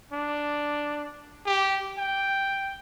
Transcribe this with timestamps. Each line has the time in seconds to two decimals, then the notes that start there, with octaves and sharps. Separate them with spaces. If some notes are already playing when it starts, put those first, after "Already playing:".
0.13 D4
1.46 G4
1.98 G5